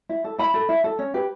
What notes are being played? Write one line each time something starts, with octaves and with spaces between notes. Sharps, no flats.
E4
A4
E4 B5
A4
E4
A4
C#4
G4 B4